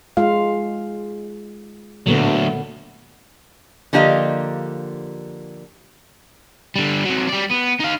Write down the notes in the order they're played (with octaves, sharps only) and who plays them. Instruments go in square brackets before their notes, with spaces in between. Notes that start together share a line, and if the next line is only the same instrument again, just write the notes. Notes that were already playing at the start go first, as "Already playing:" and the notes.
[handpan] G#3 F4 F5
[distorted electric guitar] D2 F#3 [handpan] A#2 D3 B3
[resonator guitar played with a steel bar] D3 F3 A#3 G4 D#5 F5
[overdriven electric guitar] D3 G3
C3 F#3
G3 D5
B3
D#4 F5